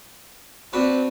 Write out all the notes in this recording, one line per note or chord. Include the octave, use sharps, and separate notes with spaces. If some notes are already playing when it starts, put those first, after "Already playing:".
C4 D4 F#4 B4